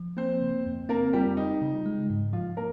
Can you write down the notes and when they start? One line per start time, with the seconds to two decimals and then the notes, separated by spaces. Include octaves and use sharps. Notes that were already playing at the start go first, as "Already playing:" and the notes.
Already playing: F3
0.17 A#3 C4 C5
0.41 C#3
0.66 F2
0.89 A#3 C4 A#4
1.13 G3 F4 G4
1.37 G3 D#4
1.62 C#3
1.86 G#3
2.10 G#2
2.33 F3 F4
2.57 A#3 A#4